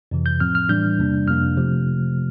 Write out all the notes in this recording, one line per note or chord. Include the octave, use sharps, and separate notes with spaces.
F2 C3 E3
G6
A2 F3 C4 F6
F6
A2 E3 G3 D4 G6
E2 C3 G3 A#3 D4
F2 C3 F3 A#3 D4 F6
C3 F3 A3